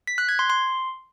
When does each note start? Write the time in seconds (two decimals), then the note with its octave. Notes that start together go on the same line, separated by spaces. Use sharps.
0.07 B6
0.18 F#6
0.29 G#6
0.39 C6
0.50 C6